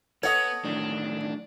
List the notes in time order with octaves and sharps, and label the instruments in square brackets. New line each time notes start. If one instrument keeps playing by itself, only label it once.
[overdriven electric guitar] B3 [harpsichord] A4 D#5 [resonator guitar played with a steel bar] C#5 F#5
[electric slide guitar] A2 D#3 F#3 [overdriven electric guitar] D4